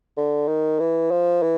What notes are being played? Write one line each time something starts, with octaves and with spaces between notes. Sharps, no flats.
D3
D#3
E3
F3
E3